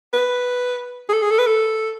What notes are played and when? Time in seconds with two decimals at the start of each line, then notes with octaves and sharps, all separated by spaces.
0.13 B4
1.09 G#4
1.13 A4
1.22 G#4
1.31 A4
1.39 B4
1.47 A4